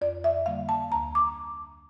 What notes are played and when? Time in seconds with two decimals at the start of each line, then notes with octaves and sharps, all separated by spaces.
0.01 F2 D5
0.24 E5
0.46 D3 G3 A#3 F5
0.69 A5
0.91 D2 A#5
1.15 D6